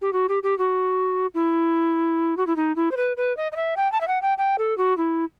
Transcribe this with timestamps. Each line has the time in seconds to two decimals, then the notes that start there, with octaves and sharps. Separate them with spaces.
0.01 G4
0.13 F#4
0.29 G4
0.43 G4
0.58 F#4
1.34 E4
2.37 F#4
2.47 E4
2.56 D#4
2.76 E4
2.91 C5
2.97 B4
3.17 B4
3.37 D#5
3.52 D#5
3.56 E5
3.76 G5
3.92 A5
4.01 E5
4.07 F#5
4.22 G5
4.38 G5
4.58 A4
4.78 F#4
4.97 E4